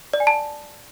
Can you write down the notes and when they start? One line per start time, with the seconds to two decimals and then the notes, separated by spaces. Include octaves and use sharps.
0.13 D5
0.20 G#5
0.27 A5